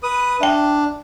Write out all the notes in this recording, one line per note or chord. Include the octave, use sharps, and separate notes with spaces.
B4 D#6
D4 E5 G5